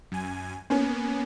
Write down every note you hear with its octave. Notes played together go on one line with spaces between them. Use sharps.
F#2 G#5
A#3 B3 C#4